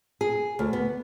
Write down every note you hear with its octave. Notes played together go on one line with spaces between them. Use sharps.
G#4
D2
B3